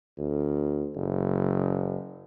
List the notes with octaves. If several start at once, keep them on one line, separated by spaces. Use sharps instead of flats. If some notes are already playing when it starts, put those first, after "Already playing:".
D2
F#1